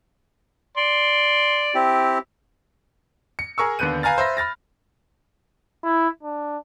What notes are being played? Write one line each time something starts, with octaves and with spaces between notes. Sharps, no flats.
D5 C6
C4 E4 G4
C#7
G#4 A#4 C#6 E6
D#2 D3 B3 F#6 G6 D#7
B4 F5 G#5 A#5 F6 A6
C5 E5 B5 A#6
B5 F6 A6 A#6
E4
D4